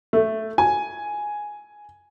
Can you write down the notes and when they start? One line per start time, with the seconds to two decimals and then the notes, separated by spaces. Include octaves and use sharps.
0.13 A3
0.58 G#5